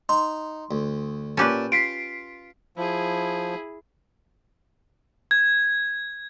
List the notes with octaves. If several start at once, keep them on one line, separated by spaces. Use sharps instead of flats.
D#4 C6
D2
A#2 C#4 G4 B4 A5
F4 B6 C7 D7
F3 E4 G#4
G#6